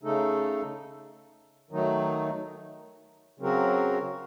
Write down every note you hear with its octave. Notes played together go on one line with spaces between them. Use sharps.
C#3 A3 D#4 A4
D#3 F#3 A3 D#4
C#3 F#3 C4 F#4 A#4